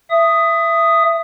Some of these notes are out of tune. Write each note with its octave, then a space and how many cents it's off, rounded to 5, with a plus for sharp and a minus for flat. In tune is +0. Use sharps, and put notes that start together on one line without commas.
E5 +20 D#6 +0